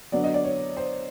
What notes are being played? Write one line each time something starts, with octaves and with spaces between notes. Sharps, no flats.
D3 F#3 B3 D4 D5
D#5
D5
C#5
C5